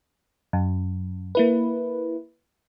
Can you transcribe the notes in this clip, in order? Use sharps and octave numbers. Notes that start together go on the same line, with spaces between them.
F#2
A#3 E4 B4